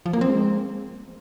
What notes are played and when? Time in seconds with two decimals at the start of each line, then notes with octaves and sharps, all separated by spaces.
0.06 F3
0.13 A#3
0.21 C4
0.29 G#3